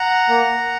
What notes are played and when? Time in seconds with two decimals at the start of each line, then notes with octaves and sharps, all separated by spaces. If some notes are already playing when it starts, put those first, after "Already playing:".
Already playing: F#5 A#5
0.29 A#3